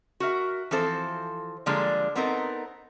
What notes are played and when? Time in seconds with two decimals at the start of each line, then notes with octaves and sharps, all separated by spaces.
0.20 F#4 A#4 E5
0.71 E3 F3 C4 A4 C5
1.66 D3 F3 G3 G#3 A#3 D4
2.15 B3 C4 D#4 A4 A#4